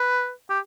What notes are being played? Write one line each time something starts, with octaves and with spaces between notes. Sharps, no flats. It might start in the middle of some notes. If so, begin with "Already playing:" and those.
Already playing: B4
G4